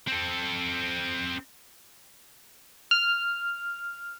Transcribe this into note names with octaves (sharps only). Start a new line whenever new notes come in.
C4 A4
F6